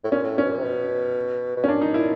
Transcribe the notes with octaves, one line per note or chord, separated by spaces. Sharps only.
A2
A#2 C#4
A2
A#2 C#4
B2
A#2
C3
B2
B2
C#4
A#2 D4
D#4
A#2 E4